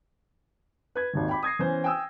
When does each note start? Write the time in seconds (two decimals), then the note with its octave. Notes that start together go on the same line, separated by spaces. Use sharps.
0.95 B4 G#6
1.13 G#1 D#2 D#3
1.29 G5 B5 D6
1.43 D#6 G#6 A#6 C7
1.59 E3 B3 C#4 C5
1.84 G5 G#5 D#6 E6